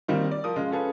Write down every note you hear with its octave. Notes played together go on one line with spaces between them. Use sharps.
D#3 G3 A#3 C4 D#4
D5
F3 A#4 D#6
C#3 G#3 F4
C#4 F4 G#4 A4 B4